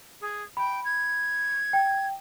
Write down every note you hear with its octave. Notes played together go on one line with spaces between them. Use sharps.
G#4
G5 B5
G#6
G5